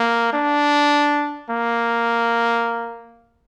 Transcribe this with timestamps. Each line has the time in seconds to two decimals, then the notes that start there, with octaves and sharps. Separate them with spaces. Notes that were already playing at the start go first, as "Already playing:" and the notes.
Already playing: A#3
0.33 D4
1.50 A#3